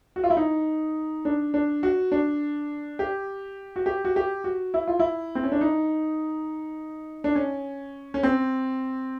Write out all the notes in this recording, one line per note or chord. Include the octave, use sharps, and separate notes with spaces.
F#4
F4
E4
D#4
D4
D4
F#4
D4
G4
F#4
G4
F#4
G4
F#4
E4
F4
E4
C4
C#4
D4
D#4
D4
C#4
C#4
C4